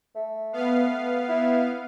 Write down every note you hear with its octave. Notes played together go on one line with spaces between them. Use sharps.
A3
B3 F5
E4